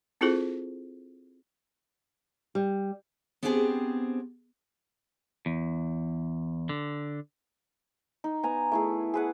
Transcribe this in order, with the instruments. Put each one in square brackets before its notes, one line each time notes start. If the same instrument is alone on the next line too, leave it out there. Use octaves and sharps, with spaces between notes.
[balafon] C4 E4 F4 G#4 A4 C5
[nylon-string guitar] G3
[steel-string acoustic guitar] B3 C4 D4 G4 G#4 C5
[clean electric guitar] E2
D3
[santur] D#4
B3 G#5 A#5
A3 E4 G#4
G#4 B4 F#5